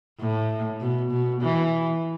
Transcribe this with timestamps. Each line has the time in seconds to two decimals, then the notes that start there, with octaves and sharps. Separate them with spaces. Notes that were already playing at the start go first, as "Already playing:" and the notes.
0.20 A2
0.81 B2
1.11 B2
1.42 E3